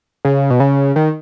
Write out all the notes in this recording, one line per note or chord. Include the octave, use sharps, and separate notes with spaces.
C#3
B2
C#3
D#3